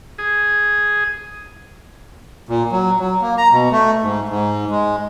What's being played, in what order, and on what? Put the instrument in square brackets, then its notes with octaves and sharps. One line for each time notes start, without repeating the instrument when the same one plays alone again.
[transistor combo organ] G#4
[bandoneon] A#2
F#3
F#3
A#3
A#5
B2
A3
G#2
G#2
G#3